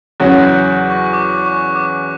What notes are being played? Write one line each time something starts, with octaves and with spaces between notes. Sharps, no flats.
E2 C#3 F#3 C#4 F#4 F#6
G6
C#6
C#6
D6
C#6
D6